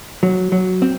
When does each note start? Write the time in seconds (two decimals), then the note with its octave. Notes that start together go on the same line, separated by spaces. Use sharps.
0.23 F#3
0.52 F#3
0.82 C4